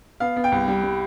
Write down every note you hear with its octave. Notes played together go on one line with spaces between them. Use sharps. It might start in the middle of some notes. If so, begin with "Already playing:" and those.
B3 F5
B3
G5
C2
G3
G3